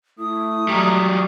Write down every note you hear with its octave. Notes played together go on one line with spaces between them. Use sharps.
A3 E4 D#6
F#3 G3 A#5